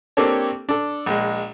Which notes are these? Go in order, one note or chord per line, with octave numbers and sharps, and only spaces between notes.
A#3 C4 D4 G4 A4 C#5
D4 A4
A#1 G#3